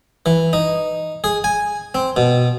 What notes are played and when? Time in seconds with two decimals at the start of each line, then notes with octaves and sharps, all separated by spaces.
0.26 E3
0.53 D#4
1.24 G#4
1.44 G#5
1.95 C4
2.16 B2